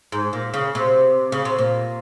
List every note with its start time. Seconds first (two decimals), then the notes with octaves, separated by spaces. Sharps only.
0.12 G#2
0.33 A#2
0.54 C#3
0.75 C3
1.32 C#3
1.45 C3
1.58 A#2